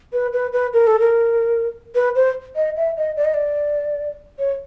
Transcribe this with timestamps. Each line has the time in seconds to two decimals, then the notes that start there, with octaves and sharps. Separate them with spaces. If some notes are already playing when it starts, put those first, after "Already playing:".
0.13 B4
0.33 B4
0.53 B4
0.73 A#4
0.87 A4
1.00 A#4
1.95 B4
2.15 C5
2.56 D#5
2.76 E5
2.97 D#5
3.16 D5
3.24 D#5
3.34 D5
4.39 C#5